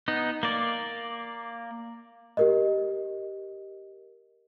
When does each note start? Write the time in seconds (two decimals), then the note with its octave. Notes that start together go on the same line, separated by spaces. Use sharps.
0.08 B3 D#4
0.43 A#3 D5
2.37 G4 A#4 D#5